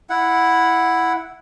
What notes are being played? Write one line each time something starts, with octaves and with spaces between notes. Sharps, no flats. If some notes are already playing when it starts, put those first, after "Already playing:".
E4 F#5